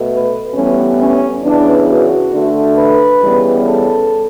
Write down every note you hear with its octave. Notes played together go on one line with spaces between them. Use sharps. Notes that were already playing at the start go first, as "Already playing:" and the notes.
Already playing: B2 A3
B4
A2 E3 G3 B3 C#4
C#4
C#3 E3 B3 D4
F#4
D3 A3
B4
C#3 E3 G3 B3
A4